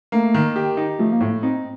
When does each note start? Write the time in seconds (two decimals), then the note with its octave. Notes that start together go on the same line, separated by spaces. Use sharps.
0.12 A3 A#3
0.34 D#3
0.56 G4
0.77 D#4
0.99 F3 A3
1.12 A#3
1.21 A2 A3
1.43 C4 D#4